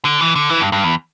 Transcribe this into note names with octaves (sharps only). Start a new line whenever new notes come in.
D3
E3
D3
E3
G2
G2
E2